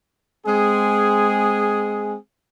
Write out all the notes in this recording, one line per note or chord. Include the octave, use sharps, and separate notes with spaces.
G#3 C4 G#4